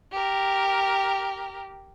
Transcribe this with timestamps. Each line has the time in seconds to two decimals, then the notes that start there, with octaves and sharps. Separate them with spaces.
0.12 G4 A#4